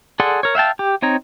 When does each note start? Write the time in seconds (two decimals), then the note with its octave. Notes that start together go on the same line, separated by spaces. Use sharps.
0.20 G#4 A4 D5 F#5 C6
0.43 A#4 C#5
0.55 E5 F5 G5 A5
0.79 G4
1.02 C4 D#4 C#5 A#5